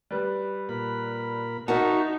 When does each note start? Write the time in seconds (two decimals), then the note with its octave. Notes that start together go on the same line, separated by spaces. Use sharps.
0.11 G3 B4
0.69 A#2 A#4 B5
1.68 D#4 F#4 A#4 E5 A5 C#6